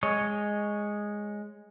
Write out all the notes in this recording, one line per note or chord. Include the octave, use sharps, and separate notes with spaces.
G#3 C#5 D#5